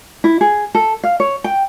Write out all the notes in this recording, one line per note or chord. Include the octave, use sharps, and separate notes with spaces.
E4
G#4
A4
F5
C#5
G5